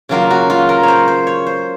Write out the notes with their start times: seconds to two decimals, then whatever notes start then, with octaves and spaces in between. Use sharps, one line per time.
0.09 C#3 F#3 A#3 F4
0.30 F#4
0.50 F4
0.69 A#4
0.83 C5 C#5
1.08 C5
1.27 C#5
1.46 C5